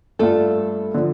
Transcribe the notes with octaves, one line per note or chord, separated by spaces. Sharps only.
G2 G3 A3 F4 A4
D3 F3